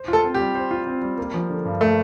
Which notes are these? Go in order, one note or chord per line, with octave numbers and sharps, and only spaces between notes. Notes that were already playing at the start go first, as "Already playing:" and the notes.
Already playing: C5
F4
A4
C4
G4
G3
C5
F4
C4
G3
A#3
F3
D3
G2
A3 A#3